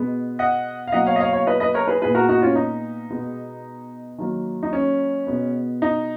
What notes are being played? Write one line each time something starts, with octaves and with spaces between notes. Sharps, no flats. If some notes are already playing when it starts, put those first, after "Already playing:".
Already playing: B2 G#3 B3
D#5 F#5
F5
B2 F#3 A#3 D#5 F#5
C#5 F5
D#5
C#5 F5
C#5 F5
B4 D#5
B4 D#5
A#4 C#5
G#4 B4
A#2 G#3 B3 G#4 B4
F#4 A#4
D#4 F#4
C#4 F4
D#4
B2 G#3 B3
D#3 F#3 A#3
D#4
C#4
B2 G#3 B3
D#4